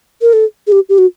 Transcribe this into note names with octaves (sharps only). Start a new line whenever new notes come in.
A#4
A4
G#4
G4
G4
F#4